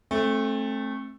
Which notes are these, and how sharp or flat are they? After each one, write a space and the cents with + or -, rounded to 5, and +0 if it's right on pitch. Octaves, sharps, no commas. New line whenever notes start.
A3 -10 C4 +35